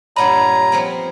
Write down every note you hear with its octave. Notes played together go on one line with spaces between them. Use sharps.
G2 A#2 C#5 D#5 F#5 A#5 B5
F3 B3 C4